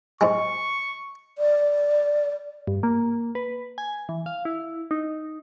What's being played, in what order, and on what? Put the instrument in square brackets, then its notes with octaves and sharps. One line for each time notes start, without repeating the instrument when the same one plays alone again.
[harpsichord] G#2 G#3 [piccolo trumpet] C#6
[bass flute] D5
[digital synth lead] G2
A#3
B4
G#5
E3
F5
E4
D#4